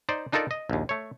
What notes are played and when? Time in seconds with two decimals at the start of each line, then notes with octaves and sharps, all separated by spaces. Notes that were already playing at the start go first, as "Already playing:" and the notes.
0.09 D#4 C5 D5
0.32 D4 D#4 F4 A4 A#4 D5
0.51 D#5
0.70 A#1 D#2
0.89 A3 C#5